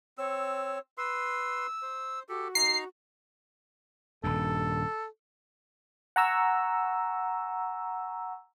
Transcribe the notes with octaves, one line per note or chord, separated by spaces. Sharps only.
C4 C#5 E6
B4 C6 E6
C5
F#4 G4 A4
D#4 A#5 C7
D#1 G2 A4
F#5 G#5 A#5 C#6 E6